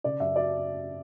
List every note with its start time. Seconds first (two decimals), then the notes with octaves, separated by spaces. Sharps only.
0.04 C#3 D5
0.20 F#2 E5
0.36 F#3 D5